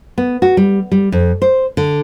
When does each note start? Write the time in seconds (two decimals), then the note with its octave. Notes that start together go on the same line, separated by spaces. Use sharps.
0.18 B3
0.42 F#4
0.57 G3
0.92 G3
1.12 F2
1.42 C5
1.77 D3